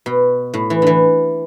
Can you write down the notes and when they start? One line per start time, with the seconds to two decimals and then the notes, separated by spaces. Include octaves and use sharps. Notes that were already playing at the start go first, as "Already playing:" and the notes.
0.06 B2
0.54 A2
0.70 E3
0.82 D3 E3